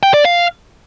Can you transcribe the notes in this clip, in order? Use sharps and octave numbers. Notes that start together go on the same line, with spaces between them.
G5
D5
F5